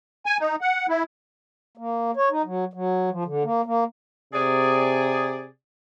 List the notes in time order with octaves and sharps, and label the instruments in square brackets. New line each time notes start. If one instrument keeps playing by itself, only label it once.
[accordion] G#5
D#4
F#5
E4
[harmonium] A#3
C#5
D#4
F#3
F#3
F3
D3
A#3
A#3
[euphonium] C3 [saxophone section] G#4 D5